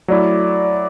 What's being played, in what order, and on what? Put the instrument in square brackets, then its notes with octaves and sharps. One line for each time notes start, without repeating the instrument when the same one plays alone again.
[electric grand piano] F#3 A3 E4 [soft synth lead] D5